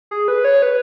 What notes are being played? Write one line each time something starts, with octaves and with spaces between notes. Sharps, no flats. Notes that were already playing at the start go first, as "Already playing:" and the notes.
G#4
B4
C#5
B4